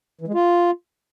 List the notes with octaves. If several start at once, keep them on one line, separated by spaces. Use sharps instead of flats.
E3
G#3
F4